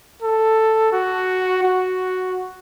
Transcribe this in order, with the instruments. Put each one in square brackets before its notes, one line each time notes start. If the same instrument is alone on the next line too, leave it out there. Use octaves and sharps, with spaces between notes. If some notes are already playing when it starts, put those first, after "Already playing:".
[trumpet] A4
F#4
F#4